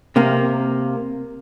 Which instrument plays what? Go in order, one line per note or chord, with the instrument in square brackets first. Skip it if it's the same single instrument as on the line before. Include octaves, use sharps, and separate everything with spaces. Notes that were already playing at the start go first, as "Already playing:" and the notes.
[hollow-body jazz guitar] C3 A#3